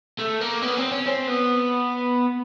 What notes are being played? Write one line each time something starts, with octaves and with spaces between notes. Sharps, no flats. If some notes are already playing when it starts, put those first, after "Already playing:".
A3
A#3
B3
C4
C#4
C4
B3